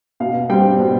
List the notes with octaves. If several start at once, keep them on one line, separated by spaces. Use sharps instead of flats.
B2 F5
G3 C4 G5
B2